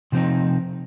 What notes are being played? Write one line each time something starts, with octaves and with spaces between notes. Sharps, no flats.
C3 F3 C4 D#4